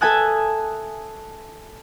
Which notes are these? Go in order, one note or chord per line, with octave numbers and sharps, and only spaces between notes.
A4 E5 G#5 A5 D#6 F#6